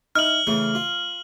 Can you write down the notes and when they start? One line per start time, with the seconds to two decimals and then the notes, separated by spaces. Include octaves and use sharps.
0.15 D#4 E4 F6 F#7
0.47 C#3 E3 A3
0.75 F4